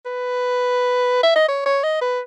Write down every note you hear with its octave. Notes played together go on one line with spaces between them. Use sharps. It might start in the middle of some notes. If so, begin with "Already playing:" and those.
B4
E5
D#5
C#5
C#5
D#5
B4